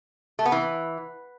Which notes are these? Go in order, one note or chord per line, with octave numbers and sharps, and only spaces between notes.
A3
B3
E3